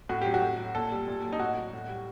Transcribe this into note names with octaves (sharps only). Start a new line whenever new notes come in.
A2 F#4
F#3 G4
F#4
A2
F#3
A#2 A4
G3
A#2
F#3
D#4
A2 F#4
F#3
A2
G3